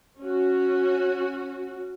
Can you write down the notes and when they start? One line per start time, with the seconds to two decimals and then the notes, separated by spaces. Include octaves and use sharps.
0.20 C#4 F#4